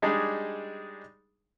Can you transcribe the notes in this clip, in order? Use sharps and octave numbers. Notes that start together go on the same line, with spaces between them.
G3 G#3 D4 D#4 G#4